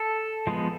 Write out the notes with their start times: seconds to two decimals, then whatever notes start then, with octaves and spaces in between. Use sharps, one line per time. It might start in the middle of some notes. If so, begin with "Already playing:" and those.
Already playing: A4
0.47 F3 G#3 B3